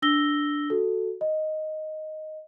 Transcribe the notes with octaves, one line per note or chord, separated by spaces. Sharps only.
D4 E6 A#6 G7
F#4 A4
D#5